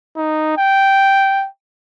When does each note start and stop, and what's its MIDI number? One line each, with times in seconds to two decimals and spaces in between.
0.17 0.54 63
0.57 1.47 79